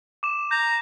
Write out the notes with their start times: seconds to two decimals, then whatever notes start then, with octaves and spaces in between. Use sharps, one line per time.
0.23 D6 E7
0.51 A#5 G6